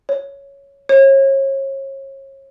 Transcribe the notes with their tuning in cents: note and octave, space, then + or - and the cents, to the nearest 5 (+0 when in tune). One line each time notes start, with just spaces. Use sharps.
C#5 +5
C#5 -35